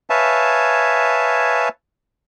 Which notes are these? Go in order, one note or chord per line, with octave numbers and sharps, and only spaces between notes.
B4 C#5 E5 F5 G#5 A5